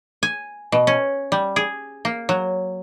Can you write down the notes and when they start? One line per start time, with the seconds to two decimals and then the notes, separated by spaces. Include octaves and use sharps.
0.23 G#5
0.72 B2
0.87 C#4
1.32 G3
1.56 G#4
2.05 A#3
2.29 F#3